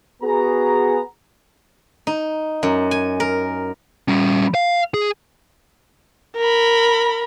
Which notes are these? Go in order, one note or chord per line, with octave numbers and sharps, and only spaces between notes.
B3 F#4 G#4 A#5
D#4
F#2
G#5
A#4
G3 C#4
F5
G#4
A#4 B5